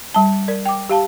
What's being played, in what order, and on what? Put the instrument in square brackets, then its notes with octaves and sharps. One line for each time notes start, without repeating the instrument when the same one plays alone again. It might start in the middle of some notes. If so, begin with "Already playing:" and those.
[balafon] G3 A5
A#4 D5
G5 D6
G4 F5 A5